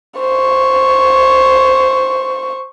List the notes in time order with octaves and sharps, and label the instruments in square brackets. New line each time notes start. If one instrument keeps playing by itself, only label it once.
[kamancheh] C5 C#6